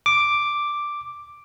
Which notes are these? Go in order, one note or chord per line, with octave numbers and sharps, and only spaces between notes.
D6